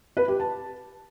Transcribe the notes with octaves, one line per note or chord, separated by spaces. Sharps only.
B4
G4
A5